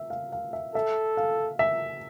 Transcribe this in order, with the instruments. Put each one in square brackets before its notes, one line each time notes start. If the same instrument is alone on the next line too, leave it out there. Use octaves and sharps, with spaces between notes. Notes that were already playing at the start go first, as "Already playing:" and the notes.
Already playing: [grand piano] E5
F5
F5
E5
[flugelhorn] A4 [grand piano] E5
[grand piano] F5
E5